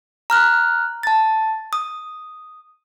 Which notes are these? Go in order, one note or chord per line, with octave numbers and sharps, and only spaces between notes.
A#5 F6 F#6
A5 A6
D#6